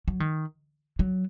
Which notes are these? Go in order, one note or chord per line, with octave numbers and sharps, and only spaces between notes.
F#3
D#3
F#3